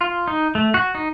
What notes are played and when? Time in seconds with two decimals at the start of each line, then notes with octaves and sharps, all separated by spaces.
0.01 F4
0.28 D#4
0.55 A3
0.74 F#4
0.95 D#4